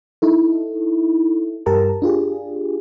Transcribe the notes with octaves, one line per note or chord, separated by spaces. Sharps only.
D#4 E4 A4
G2 G4 A#4 A5 A#5
D4 F4 G4 G#4